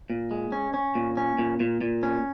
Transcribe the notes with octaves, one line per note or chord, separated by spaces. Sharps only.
A#2
G#3
C#4
C#4
A#2
C#4
A#2
A#2
A#2
C#4